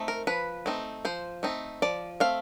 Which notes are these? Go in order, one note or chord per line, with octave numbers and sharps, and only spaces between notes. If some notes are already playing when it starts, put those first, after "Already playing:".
Already playing: A3 C4 D#4
A#4
F3 B4
A3 C4 D#4
F3 C5
A3 C4 D#4
F3 D5
A3 C4 F5